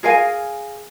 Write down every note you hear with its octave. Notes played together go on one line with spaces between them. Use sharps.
G#4 A#4 F5 G#5